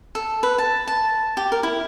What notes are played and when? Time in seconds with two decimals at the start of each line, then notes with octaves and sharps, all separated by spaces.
0.15 A4
0.43 B4
0.58 A5
0.87 A5
1.37 G4
1.52 A#4
1.63 E4